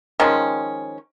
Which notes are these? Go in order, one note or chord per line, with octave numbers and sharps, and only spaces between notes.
D#3 F3 G#3 C#4